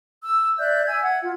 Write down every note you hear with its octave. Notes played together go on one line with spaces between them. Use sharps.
E6
D5 E5 F#6 G6
E5 G#5 E6 G#6
F#5 G#6
F4